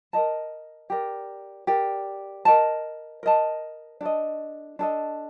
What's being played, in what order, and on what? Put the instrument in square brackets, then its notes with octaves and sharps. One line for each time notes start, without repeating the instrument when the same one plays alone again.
[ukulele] A#4 D#5 A5
G4 A#4 D5
G4 A#4 D5
A#4 D#5 A5
A#4 D#5 A5
D4 A4 D#5
D4 A4 D#5